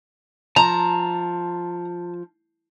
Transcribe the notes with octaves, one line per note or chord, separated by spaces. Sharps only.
F3 A5 A#5